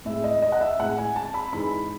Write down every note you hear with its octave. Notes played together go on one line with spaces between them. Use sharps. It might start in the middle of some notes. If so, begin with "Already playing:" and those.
A2 G#3 E5
D#5
D#5
F#5
E5
A2 G#3 F#5
G#5
A5
B5
G#2 E3 G#3 B5